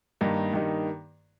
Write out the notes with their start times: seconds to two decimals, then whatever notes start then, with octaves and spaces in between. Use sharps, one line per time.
0.21 G2 D#3 A#3 D#4
0.54 G2 D#3 A#3 D#4